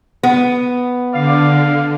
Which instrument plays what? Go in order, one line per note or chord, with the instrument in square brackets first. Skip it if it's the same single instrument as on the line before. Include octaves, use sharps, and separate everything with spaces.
[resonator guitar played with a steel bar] B3
[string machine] D3 [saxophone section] D5 F5